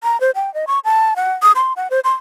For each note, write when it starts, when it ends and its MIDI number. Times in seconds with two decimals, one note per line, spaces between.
0.04 0.19 82
0.21 0.31 72
0.35 0.52 79
0.54 0.65 75
0.67 0.79 85
0.85 1.14 81
1.16 1.32 78
1.42 1.52 87
1.56 1.73 84
1.76 1.88 78
1.91 2.00 72
2.04 2.13 84